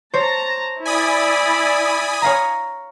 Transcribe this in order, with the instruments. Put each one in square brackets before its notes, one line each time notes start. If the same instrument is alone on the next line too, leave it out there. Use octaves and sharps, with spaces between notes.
[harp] C5 C#5 [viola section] A5 A#5
[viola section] E4 D5 [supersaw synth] G#5 B5 D#6
[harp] C#5 F5 A#5